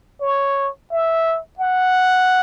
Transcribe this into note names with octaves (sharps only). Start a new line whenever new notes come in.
C#5
E5
F#5